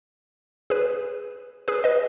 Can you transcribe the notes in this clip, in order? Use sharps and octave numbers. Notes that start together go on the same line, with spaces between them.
G#4 B4
G#4 B4
B4 D#5